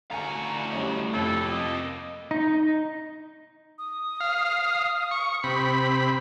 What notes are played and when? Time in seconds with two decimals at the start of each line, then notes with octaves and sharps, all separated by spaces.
0.11 D2 A2 F#4 F5 G#5 A#5
0.72 G3 C#4 D#5
1.13 F2 C3 F3 A#3 A4 B4
1.51 D#5
2.31 D#4
3.78 D#6
4.20 F5
5.11 C#6
5.44 C3 B5